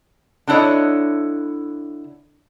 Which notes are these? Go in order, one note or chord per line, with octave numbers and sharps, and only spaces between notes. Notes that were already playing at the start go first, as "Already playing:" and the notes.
D3 D4 E4 C#5 D#5